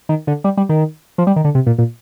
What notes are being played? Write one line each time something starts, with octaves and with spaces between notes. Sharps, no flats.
D#3
D3
G3
G3
D#3
F3
G3
D#3
D3
C3
A#2
A#2